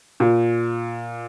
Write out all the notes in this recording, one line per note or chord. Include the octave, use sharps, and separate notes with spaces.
A#2